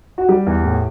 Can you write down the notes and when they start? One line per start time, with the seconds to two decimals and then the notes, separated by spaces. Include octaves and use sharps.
0.18 F#4
0.28 G3 G4
0.47 E2
0.64 A2